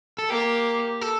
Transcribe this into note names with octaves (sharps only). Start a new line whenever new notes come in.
A4
A#3 G4
A4